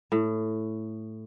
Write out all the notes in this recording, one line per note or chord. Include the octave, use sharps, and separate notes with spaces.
A2